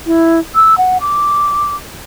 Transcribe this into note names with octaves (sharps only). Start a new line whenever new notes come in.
E4
E6
F#5
D6